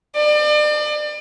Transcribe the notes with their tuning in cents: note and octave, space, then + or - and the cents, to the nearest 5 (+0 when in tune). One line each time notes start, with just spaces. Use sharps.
D5 +40